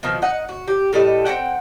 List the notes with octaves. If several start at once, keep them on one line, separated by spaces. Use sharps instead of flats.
B2 D#3 F3
D#4 F#5
F#4
G4
A2 G3 A4 D#5
C4 C#4 F#5 G5